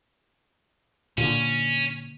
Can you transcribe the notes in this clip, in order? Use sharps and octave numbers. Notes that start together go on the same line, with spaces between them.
A#2 D3 C#4